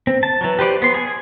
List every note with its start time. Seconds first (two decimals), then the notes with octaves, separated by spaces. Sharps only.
0.07 C4
0.23 A5
0.41 E3 F#3
0.59 G4 B4 C5 D5
0.82 B3 C6
0.94 G#4 G#5